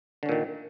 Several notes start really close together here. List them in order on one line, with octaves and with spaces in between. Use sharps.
D3 C#4 A#2 D#3